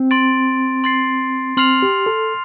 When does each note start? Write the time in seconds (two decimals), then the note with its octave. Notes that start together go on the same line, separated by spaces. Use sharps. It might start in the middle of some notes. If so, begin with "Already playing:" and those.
Already playing: C4
0.11 C6 A6 D7
0.84 C6 A6 C7
1.57 C4 C6 F6 C7 F7
1.82 G4
2.06 A4